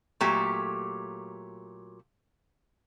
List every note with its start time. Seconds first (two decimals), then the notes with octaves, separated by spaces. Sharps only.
0.21 A#2 F#3 A3 G4